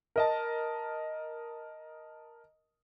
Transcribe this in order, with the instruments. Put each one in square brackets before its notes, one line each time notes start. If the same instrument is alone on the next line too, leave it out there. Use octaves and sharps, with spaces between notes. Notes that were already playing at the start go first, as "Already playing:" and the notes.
[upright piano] A#4 D#5 A5